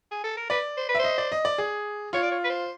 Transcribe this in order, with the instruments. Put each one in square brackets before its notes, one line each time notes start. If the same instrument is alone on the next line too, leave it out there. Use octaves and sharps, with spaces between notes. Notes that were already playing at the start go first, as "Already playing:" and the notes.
[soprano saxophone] G#4
A4
A#4
[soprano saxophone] B4 [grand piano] D5
[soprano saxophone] C5
B4
[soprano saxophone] C5 [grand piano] E5
[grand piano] D#5
D5
D#5
D5
G#4
[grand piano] F4 [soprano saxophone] C#5
[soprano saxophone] D5
C#5
B4
C5